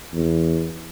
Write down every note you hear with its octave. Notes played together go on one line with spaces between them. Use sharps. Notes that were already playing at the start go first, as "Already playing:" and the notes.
E2